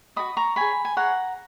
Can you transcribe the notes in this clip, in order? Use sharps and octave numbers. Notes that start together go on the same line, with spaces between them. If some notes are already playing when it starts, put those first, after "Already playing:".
F#4 A#4 D#5 B5 D#6
A#5 C#6
G#4 C#5 G#5 B5
G#5
G#4 C#5 F#5 A#5